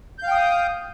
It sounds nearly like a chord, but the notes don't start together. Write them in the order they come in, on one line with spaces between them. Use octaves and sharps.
G6 F5 G5 D#6